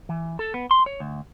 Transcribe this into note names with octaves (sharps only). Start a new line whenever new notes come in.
E3
A4
B3
C6
C#5
D2